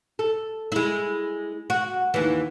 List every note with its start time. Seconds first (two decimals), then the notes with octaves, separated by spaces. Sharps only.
0.19 A4
0.72 G#3 E4
1.70 F#4
2.14 D#2 E3